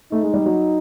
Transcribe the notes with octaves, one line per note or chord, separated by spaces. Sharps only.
A3 D#4
G#3
G3
F#3